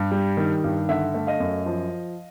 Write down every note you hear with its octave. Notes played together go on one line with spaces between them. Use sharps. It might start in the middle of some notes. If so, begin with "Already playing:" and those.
Already playing: G2
G3
D#3
G2
D3 E5 F#5
A3
D#5 F5
F#2
F3